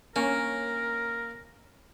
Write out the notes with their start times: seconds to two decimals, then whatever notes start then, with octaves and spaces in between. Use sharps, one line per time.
0.16 A#3 C#4 A#4